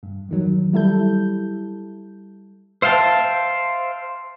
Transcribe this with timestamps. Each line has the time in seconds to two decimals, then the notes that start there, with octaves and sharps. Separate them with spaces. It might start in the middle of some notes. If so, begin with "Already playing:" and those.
0.03 G2
0.29 E2 D#3 F#3
0.73 G3 E4 A4 G6
2.82 C5 E5 F5 G5 A5